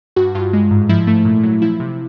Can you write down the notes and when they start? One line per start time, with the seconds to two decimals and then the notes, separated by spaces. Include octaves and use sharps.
0.16 G2 F#4
0.35 G2 F4
0.53 G#3
0.71 G#2
0.89 F3 E4
1.07 A3
1.25 A#2
1.43 F#3
1.62 F3 E4
1.80 C3